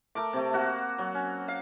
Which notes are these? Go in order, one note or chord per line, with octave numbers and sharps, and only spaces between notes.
A3 A#4 D6
C3 A3
A#3 F#4 F#5
F#3
C#4
F5